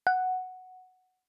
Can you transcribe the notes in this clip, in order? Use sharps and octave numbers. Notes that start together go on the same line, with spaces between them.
F#5